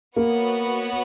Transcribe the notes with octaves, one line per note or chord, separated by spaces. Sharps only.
A#3 B3 F#4 C#5 F#5